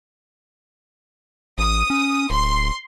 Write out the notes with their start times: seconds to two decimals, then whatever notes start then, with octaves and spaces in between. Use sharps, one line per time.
1.58 A1 D#6
1.90 C#4
2.30 D1 C6